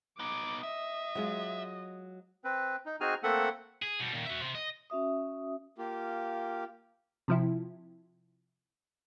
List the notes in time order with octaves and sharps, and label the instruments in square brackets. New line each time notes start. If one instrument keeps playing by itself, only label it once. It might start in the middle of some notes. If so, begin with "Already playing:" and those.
[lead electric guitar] B3 D#4 [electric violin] D6
[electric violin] D#5 [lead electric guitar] E5
[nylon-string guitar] F#3 G#3 F4
[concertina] C4 B4
D#4
C4 D#4 F#4 G#4 G#5 F6
A3 A#3 C4 A4 E5 F#5
[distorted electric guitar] G#4
B2 G3
A#2 D#3
F#4 E5
C3 C4
D#5
[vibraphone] C#4 F#4 E5 D#6
[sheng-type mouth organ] A#3 F4 G4
[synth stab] C3 F3 E4